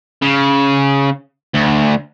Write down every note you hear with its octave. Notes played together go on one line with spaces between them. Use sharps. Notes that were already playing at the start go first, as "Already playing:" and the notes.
C#3
D2